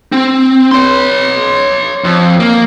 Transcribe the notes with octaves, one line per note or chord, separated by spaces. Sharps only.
C4
C#5 C6
F2
A#3